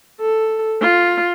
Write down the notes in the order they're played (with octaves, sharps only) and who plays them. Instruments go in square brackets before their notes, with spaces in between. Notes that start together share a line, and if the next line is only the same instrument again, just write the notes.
[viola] A4
F4